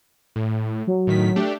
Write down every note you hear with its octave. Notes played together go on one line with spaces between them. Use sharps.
A2
F#3
A2 D#3 B6
A3 D4 G4